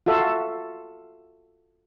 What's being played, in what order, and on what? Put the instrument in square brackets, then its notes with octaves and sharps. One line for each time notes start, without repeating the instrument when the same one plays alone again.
[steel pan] F4 F#4 A4 E5